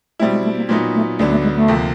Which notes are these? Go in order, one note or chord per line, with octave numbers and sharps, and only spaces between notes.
B2 G3 A3 C4 E4
G#3
A3
A#3
A#2 F#3 A3 B3 D#4
A3
D2 D3 F#3 A3 B3 D4
A3
G#3
A3
D2 C3 F3 A#3